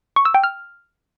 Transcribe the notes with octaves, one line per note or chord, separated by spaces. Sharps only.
C#6
E6
G5
F6